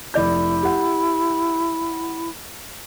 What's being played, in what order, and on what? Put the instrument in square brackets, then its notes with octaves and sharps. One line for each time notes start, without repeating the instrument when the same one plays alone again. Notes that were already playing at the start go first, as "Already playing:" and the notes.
[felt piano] F1 D5 G6 [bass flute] E4
[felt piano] G4 F#5